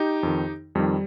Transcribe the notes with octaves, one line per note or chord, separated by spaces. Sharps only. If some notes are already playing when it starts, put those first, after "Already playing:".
Already playing: D#4 G4
F2 D#3
F2 D#3 G3